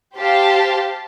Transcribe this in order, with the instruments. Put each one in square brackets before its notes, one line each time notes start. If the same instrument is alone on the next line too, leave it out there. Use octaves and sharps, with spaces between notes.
[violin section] G4 C5 F5 A5